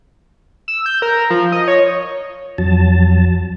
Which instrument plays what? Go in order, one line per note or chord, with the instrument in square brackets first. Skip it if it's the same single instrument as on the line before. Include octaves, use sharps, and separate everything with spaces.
[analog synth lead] E6
G6
A#4
F3
D#5
C#5
[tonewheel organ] F2 F#3 A5